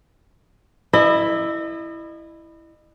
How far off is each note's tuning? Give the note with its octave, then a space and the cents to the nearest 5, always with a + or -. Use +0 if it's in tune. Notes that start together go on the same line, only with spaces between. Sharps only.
E4 +0 D#5 -35